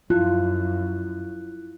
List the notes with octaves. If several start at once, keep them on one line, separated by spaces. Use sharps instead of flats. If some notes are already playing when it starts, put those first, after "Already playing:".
F#2 E4 F4 F#6